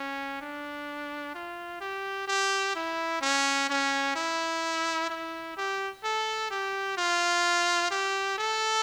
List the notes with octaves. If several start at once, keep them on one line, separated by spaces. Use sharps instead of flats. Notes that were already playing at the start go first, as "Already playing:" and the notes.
Already playing: C#4
D4
F4
G4
G4
E4
C#4
C#4
E4
E4
G4
A4
G4
F4
G4
A4